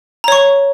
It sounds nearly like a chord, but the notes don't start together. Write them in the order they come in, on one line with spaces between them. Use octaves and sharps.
A#5 C#5 C#6